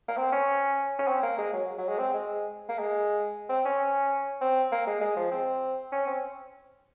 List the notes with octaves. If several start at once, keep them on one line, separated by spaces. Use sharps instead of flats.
A#3
C4
C#4
C#4
C4
A#3
G#3
F#3
F#3
G#3
C4
G#3
A#3
G#3
C4
C#4
C4
A#3
G#3
G#3
F3
C4
C#4
C4